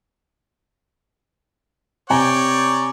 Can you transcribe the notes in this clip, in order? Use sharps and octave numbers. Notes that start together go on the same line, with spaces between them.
C3 C#5 D5 G5 G#5 A#5